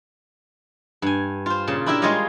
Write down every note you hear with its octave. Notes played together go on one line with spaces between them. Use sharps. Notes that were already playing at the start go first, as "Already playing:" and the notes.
G2 G#5
F4 C5
A#2 C#3 A5
D4 E4 G4 A#4 E5
G3 G#3 F4 C#5 D#5 F5